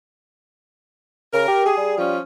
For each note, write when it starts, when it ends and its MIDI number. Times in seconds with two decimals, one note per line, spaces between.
1.34 1.46 49
1.34 1.63 70
1.48 1.77 67
1.65 1.96 68
1.77 2.14 55
1.97 2.18 53
1.97 2.18 61
1.97 2.18 65